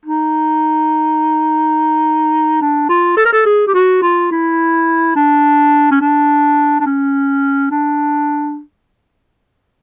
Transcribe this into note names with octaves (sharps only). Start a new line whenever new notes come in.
D#4
D4
F4
A4
A#4
A4
G#4
G4
F#4
F4
E4
D4
C#4
D4
D4
C#4
D4